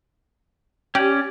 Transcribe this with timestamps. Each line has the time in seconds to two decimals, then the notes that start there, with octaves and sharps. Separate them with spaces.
0.95 C#4 G4 D5